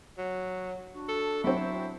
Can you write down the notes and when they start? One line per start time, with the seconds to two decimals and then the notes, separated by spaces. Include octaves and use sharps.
0.18 F#3
0.92 D4 F#4
1.08 A4
1.44 F#3 C4 E4